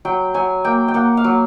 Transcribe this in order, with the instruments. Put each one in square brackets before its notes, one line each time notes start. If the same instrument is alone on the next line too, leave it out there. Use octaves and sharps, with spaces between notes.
[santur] F#3 G5
F#3 G#5
A#3 G5
G5
A#3 F#5
F5
F#3